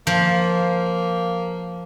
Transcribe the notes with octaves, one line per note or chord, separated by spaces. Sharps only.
F3 A#3